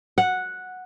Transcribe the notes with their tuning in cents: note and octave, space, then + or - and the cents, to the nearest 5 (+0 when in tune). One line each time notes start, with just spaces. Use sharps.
F#5 -5